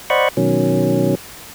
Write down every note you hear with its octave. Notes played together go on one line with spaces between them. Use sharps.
C5 D5 D#5 F#5 B5 C#6
B2 D#3 F#3 C#4